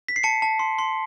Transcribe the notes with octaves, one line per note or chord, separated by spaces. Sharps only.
B6
C7
A5 C#7
A5
C6
C6